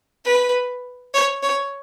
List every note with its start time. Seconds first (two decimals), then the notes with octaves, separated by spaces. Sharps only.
0.24 B4
1.14 C#5
1.43 C#5